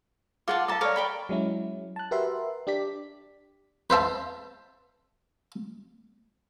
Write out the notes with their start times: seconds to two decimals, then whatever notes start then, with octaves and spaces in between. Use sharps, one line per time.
0.48 F4 G#4 F#5 A5 D6
0.68 A4 F5 A5 A#5 D6
0.81 A4 A#4 C#5 D5 F5
0.96 A#4 G5 B5
1.29 F#3 G#3 C#4 E4
1.96 A5 F#6
2.11 F#4 G4 A#4 B4 E5 C6
2.67 D4 G4 D5 B6
3.90 B4 C5 E5 A5